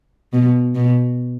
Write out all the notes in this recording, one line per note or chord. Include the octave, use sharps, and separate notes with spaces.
B2
B2